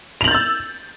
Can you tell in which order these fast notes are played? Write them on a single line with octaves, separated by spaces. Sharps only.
F7 F#7 G6 A6 E6